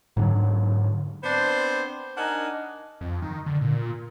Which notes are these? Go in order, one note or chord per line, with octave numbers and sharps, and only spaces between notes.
G#2 D3 F#3
B3 C4 D4 C5
D4 D#4 A#4 F#5 G#5
F2
D#3
D3
A#2